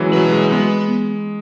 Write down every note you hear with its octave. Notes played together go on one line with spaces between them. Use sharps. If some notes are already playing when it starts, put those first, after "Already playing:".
Already playing: E3 F#3 G#3 C#4
F#3 F#4 B4
G#3
G#3 B3